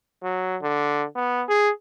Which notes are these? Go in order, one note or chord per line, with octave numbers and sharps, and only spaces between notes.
F#3
D3
B3
G#4